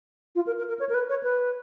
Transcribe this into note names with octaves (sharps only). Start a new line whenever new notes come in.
F4
A#4
A#4
A#4
C#5
A#4
B4
C#5
B4